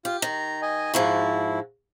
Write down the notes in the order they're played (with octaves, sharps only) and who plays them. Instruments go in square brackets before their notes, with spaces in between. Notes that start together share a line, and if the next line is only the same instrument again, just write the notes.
[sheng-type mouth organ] F4 [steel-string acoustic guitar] G4
[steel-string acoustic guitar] D#3 [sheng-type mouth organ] A#5
[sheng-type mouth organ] D#5 G#5
[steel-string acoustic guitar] G#2 F3 F#4 [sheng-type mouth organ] E4